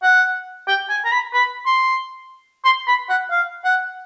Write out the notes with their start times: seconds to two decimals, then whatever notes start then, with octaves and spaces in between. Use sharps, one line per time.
0.03 F#5
0.68 G5
0.90 G#5
1.05 A#5
1.12 B5
1.34 B5
1.66 C6
2.65 C6
2.88 B5
3.10 F#5
3.31 F5
3.65 F#5